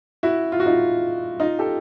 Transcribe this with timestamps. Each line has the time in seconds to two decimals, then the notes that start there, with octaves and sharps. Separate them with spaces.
0.23 E4 F#4
0.52 F4
0.60 F#4
0.66 D#4 F4
1.40 D#4 F4
1.59 G4 A4